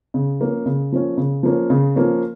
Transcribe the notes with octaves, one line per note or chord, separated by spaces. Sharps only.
C#3
F3 A#3 C#4
C#3
F3 A#3 C#4
C#3
F3 A#3 C#4
C#3
F3 A#3 C#4